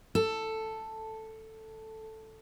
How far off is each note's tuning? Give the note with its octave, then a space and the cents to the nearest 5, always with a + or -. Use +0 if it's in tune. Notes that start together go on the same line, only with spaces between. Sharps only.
A4 +5